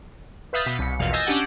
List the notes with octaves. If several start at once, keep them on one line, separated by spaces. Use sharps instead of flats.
B4 E5 F5 D#6 G6 A6
B2 B6
C2 C#7
A#1 E2 B2 F5
D#5 G#5 E6 G6 A6 A#6
C#4 D4 G4 F#5